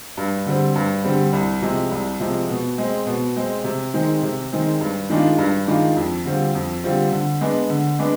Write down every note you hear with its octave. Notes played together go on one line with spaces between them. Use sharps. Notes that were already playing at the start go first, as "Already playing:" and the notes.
G2
D3 G3 C4
G2
D3 G3 C4
C2
C3 F3 G#3
C2
C3 F3 G#3
B2
G#3 C4
B2
G#3 C4
C3
D#3 G#3 C4
C3
D#3 G#3 C4
G2
D#3 G#3 D4 F4
G2
D#3 G#3 D4 F4
F2
D3 G3 C4 F4
F2
D3 G3 C4 F4
D3
G#3 B3 D4
D3
G#3 B3 D4